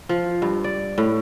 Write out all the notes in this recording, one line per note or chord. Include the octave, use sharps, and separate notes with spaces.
F3
G2
D5
A2